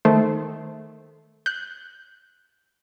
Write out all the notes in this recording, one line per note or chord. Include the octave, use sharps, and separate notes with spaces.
D#3 A3 C5
F#6 G6